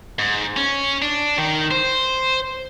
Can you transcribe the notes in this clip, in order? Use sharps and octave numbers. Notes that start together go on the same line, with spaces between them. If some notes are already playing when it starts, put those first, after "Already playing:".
G#2
C#4
D4
D#3
C5